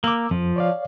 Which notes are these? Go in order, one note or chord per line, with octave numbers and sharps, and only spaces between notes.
A#3 D6 E6
F2 F3
C#5 D5 F5